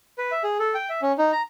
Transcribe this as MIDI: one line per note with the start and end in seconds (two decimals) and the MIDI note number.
0.18 0.31 71
0.31 0.43 76
0.44 0.57 68
0.59 0.74 69
0.74 0.89 79
0.89 1.01 76
1.02 1.12 61
1.18 1.32 63
1.32 1.42 82